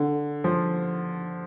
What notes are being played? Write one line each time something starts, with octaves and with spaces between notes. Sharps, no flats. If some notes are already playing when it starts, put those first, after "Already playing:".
Already playing: D3
F3